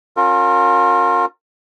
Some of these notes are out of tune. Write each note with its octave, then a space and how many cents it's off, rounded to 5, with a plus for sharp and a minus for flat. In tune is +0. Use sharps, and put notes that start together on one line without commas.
C#4 -10 F4 +35 A#4 -25